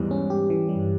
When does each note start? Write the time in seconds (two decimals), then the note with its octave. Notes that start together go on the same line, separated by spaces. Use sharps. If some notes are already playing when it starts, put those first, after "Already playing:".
Already playing: E2 G#2 E3 G3
0.11 C#4
0.30 G4
0.50 E3
0.68 G2 G3